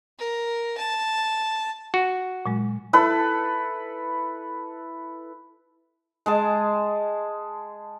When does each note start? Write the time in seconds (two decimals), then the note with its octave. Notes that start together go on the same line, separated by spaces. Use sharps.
0.19 A#4
0.77 A5
1.94 F#4
2.46 A#2 F#3 G#3
2.93 E4 A4 B4 A5
6.26 G#3 G#4 A5